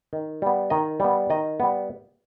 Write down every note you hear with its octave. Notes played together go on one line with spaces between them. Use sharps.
D#3
G3 B3
D#3 D#5
G3 B3
D#3 D#5
G3 B3